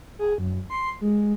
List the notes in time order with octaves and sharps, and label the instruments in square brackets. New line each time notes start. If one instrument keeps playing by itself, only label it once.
[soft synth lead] G#4
F#2
C6
G#3